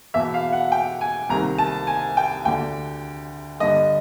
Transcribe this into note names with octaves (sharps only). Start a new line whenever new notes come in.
E2 B2 E5
F5
F#5
G5
G#5
C2 C3 D#3 A#5
A5
G#5
G5
D2 D3 G5
G2 D3 D#5